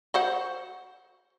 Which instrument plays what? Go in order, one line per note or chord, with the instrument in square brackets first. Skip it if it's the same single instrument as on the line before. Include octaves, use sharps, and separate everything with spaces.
[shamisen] F#4 C5 F#5